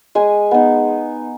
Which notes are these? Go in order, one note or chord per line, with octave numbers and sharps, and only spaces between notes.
G#3 G#5
B3 D#4